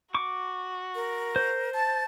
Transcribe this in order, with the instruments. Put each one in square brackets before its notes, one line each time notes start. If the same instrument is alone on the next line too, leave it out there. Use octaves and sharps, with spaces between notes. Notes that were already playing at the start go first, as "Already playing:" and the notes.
[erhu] F#4 [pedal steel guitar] C#6 D6
[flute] A#4
[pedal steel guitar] C5
[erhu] A5 [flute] A6